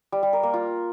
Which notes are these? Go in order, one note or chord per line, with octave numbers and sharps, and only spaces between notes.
G3
G3
A#4
A#3
F4